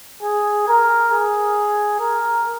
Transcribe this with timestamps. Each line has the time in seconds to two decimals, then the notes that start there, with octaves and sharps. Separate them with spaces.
0.23 G#4
0.68 A#4
1.12 G#4
1.99 A#4